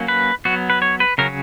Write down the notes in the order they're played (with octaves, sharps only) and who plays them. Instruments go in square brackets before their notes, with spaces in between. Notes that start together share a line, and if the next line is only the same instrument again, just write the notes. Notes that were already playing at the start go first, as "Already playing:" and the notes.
Already playing: [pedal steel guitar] F#3 A#3 C#4
B4
F#3 B3 F#4
B4
C#5
B4
C#3 F#3 C#4 A#4